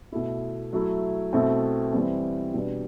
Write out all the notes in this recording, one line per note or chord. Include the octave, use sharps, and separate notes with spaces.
B2 A3 E4
F#3 A3 E4
B2 A3 C4 E4
E3 G3 C4
B2 G3 B3 D4